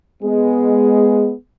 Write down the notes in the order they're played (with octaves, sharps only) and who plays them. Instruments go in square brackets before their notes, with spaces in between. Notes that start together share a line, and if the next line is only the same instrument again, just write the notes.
[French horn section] G#3 B3 G#4